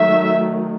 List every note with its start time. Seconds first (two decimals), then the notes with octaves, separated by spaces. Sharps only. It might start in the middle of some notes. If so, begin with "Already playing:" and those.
Already playing: D#3 F#3 A3 E5